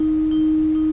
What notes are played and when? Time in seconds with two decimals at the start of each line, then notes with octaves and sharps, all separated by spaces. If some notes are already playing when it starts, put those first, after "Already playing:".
Already playing: D#4
0.31 D#4
0.75 D#4